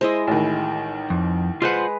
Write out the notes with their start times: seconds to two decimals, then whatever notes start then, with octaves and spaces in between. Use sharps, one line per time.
0.01 G#3 E4 C5 D#5
0.27 A1 D#3
1.10 F2
1.62 G#3 F4 B4 C5 F#5